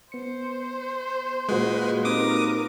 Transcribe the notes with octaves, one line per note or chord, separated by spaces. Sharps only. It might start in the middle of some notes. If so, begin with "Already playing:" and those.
B3 C5 C#7
A#2 G#3 F#4 B4
C4 D#4 G4 A#4 D6 D#6